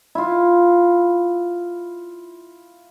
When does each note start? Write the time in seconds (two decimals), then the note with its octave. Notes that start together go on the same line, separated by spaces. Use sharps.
0.15 E4 F4